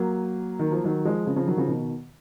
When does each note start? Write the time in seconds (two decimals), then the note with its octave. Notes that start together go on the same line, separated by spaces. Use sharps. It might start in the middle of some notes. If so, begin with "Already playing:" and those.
Already playing: F#3 A#3
0.59 D#3
0.72 F3
0.84 D#3 F#3
1.05 F3 G#3
1.26 C#3 F3
1.36 C#3 F3
1.47 D#3 F#3
1.58 C#3 F3
1.68 B2 D#3